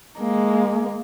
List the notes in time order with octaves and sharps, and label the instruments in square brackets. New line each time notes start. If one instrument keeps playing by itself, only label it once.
[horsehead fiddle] G#3 A#3